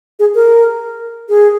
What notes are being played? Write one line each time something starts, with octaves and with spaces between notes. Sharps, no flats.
G#4
A#4
G#4